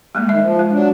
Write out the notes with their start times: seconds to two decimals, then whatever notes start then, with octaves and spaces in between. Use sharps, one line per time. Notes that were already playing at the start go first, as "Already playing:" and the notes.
0.15 G3 G#3 A#3
0.29 D#3 E5
0.41 F3
0.59 G#3
0.72 F#3 D4